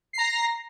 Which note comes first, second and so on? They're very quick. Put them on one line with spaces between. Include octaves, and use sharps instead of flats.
C7 A#5 A#6